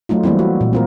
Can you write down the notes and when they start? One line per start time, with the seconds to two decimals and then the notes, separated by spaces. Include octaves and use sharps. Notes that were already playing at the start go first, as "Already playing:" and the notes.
0.09 F#3 A3 D#4 F4
0.24 E3 G3 A#3 C4 E4
0.39 F#4
0.61 A#2
0.73 C4 F4 A#4